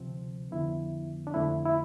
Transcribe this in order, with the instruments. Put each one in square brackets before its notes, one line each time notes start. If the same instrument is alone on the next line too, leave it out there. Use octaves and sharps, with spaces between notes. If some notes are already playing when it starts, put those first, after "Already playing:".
Already playing: [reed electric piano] D2 C3 F3 C4
F2 D3 F3 B3 E4
D4
F2 D3 A3 C4 E4
E4